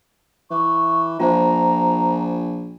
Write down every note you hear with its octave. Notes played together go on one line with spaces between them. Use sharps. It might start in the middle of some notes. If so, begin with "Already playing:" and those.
E3 C#6
A#1 F4 C5 A#5